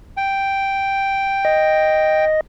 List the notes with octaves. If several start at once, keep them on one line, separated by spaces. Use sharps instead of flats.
G5
D#5